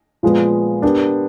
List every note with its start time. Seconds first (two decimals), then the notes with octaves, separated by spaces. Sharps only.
0.23 A#2 F3 G#3 B3
0.82 B3 D4 G4 A#4